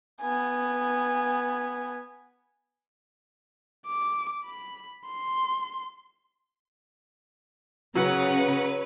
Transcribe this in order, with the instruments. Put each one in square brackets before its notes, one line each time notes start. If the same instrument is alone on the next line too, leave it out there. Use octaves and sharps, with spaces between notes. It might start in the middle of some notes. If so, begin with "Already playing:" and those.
[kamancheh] B3 G#5
[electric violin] D6
B5
C6
[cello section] C#3 [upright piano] F#3 [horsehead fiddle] A#4 F#5 [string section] B4 C#5